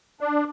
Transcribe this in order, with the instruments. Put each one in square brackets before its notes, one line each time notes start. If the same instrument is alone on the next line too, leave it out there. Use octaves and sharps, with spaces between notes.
[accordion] D4